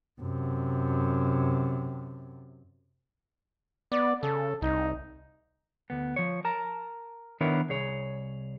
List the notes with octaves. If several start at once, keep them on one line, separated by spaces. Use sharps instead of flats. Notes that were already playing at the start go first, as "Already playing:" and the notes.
F#2 C3
B3 D5
C#3 A4
C2 D#4
D2 B3
F3 C#5
A#4 A5 A#5
D#3 B3 D4 E4 A#4 C#5
C2 G#4 C#5